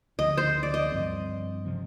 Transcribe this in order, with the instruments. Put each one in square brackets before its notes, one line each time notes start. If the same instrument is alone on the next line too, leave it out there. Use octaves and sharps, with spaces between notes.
[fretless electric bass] D2 D3 F3 [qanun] D#5
[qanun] C5
D5
D#5
[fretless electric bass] G2 F3 C4
C3 F3 C4